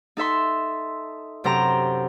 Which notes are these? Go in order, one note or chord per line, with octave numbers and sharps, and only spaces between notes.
D#4 A4 E5 C6
F#2 C3 A4 C5 G5 A#5